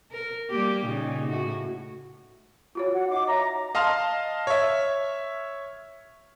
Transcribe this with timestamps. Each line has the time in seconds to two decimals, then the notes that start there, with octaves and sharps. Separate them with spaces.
0.11 A#4
0.50 G3 A#3 G4
0.85 A#2 C#3 D#4
1.29 A2 F#4
2.75 F4 F#4 C#5
2.93 F#5
3.09 D#4 D#5 D6
3.27 C#5 E5 A#5
3.75 D#5 F5 A5 C6 F6
4.47 C#5 E5